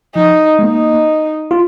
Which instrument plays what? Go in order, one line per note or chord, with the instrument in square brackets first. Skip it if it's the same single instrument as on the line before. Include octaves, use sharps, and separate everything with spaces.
[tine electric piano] F3 [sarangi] D#4
[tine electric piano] G#3
[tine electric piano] A#3 [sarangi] D#4
[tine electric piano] F4